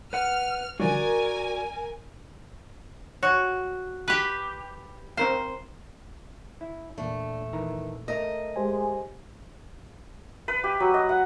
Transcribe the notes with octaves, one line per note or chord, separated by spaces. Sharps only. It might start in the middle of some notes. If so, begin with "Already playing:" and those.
B4 F#5 F6
D3 F3 G3 F#4 A#4 D5 G#5
F#4 C#5
G4 B4
C4 A#4 C5 F5
E4
E2 A#2 A3 D4
D#3 E3 A#5
A3 A#4 D#5 A#5
G#3 G4 C5 G#5
B4
G4
F#3
D#5
F#5